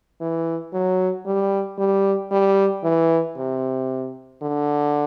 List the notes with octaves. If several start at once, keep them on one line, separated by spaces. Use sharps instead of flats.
E3
F#3
G3
G3
G3
E3
C3
D3